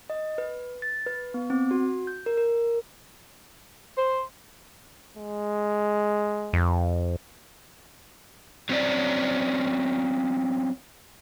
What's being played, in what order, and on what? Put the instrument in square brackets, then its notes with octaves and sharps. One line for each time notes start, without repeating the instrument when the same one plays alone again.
[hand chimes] D#5
B4
A6
B4
B3
C4
F#4
G6
A#4
A#4
[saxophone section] C5
[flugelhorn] G#3
[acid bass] F2
[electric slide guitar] F#3 C4 C#4 C5 D5